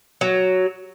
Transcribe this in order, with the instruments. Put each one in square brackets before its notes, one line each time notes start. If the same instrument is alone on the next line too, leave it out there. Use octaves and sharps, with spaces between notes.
[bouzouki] F#3